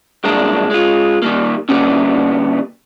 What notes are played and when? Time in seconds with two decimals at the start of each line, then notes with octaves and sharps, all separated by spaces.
0.24 C2 F#2 G#3 A#3 D4 A#4
0.70 G#3 F4
1.22 D#3 G3 A#3
1.69 D3 G3 A#3 B3 C#4